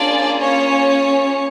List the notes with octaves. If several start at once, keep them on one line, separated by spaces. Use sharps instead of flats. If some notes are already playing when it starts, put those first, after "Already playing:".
Already playing: A#3 C#4 D4 F4 G#4 D5
C#4 C#5